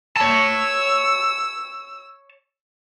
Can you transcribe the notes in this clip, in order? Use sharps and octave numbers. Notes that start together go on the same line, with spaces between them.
C#5 A5 E6